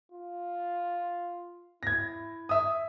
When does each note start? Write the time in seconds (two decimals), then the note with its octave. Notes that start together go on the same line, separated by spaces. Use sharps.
0.12 F4
1.83 E4 G#6 A#6
2.49 E5 D#6